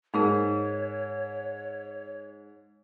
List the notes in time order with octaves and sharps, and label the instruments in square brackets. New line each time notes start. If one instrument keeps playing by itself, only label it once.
[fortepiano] G#2 [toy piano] D#4 G#4 A#4 [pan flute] C#5